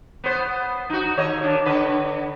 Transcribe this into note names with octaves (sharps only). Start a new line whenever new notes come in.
B3 C5
D#4 F#4
D#2 C#5 D#5
D#3 D4
D3 B4 D#5